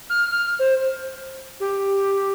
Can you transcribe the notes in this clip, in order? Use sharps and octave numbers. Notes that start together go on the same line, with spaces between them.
F6
F6
C5
G4